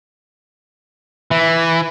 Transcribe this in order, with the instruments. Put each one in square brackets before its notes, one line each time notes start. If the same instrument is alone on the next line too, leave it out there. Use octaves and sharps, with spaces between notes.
[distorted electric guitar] E3